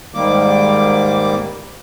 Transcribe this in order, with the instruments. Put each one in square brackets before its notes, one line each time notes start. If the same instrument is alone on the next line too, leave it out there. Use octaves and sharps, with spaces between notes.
[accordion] G#2 D#3 G3 A#3 D6